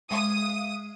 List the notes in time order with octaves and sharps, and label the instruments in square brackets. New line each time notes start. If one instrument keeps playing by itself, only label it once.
[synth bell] G#3 E5 F5 [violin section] D#6